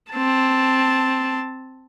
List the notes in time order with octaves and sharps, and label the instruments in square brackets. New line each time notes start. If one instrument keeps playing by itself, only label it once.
[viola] C4 A5